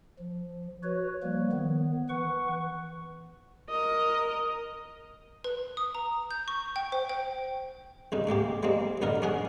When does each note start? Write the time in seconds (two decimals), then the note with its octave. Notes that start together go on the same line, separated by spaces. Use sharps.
0.19 F3
0.83 F#4 B4 C#5
1.23 F3 G3 A#3
1.52 D#3 B3
2.09 E3 B4 F#5 C#6
3.69 A#4 D#5
5.44 B4
5.77 D#6
5.95 A#5
6.31 G6
6.48 C#6
6.76 G5
6.92 C5
7.09 G5
8.12 C2 C#3 D#4
8.27 G#2 G#3 A#3 G4
8.63 G3 G#3 A#3 C4 D#4
9.02 B1 F#2 D3 D#4 A#4
9.22 C#4 D4 G#4 F#5 G#5